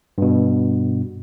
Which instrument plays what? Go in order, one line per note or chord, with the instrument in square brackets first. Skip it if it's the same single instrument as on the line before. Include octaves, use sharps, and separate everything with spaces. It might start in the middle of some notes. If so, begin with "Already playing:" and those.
[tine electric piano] G2 B2